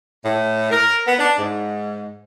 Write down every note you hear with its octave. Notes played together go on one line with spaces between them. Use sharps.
A2
A#4
B3
D4
G#2